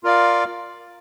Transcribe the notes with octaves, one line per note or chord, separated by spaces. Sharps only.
F4 A#4 D5 F5